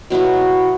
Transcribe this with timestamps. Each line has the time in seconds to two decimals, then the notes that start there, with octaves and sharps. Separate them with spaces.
0.10 B2 F#3 B3 E4